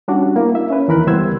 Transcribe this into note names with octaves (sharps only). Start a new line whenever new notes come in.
G3 C#4 D4 F#4 D5
A#3 E4
E5
C#4 B4
D#2 E3 A#4 B5 F#6
C#2 G3 B3 C5 E6 G#6